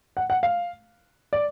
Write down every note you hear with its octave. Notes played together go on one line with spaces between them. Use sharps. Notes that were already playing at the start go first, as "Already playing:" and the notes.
F#5
F#5
F5
D5